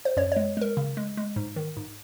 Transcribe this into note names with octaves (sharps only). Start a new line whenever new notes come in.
C5
F#2 C#5
C#5
G#3
G#3 A#4
C#3
G#3
G#3
G#2
D#3
G#2